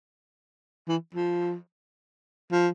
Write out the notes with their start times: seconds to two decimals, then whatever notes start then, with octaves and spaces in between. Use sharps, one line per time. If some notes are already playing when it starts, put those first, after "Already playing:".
0.88 E3
1.15 F3
2.52 F3